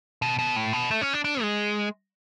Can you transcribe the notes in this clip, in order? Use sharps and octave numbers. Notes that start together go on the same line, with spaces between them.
B2
B2
A2
B2
A3
C#4
D4
D4
G#3